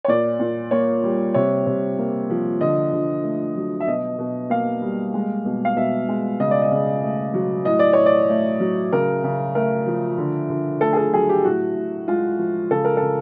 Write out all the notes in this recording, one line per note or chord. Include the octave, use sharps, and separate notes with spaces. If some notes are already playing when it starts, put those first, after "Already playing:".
C#5
A#2 D5
A#2
A#3 C#5
G3
C3 C#5
C3
A#3
F3
D3 D#5
D3
A3
F#3
E5
B2 D#5
B2
A#3 F5
G3
G#3
B2
F5
B2 E5
G#3
C#3 D#5
D5
D#5
C#3
A3
F#3
A2 D#5
D5
A2 C#5
D5
A3
F#3
C#3 A#4
C#3
A3 A#4
F3
D3
D3
A3 A4
G#4
A4
F#3 G#4
G4
A2 F#4
A2
G#3 F4
F3
C#3 A4
A#4
C#3 A4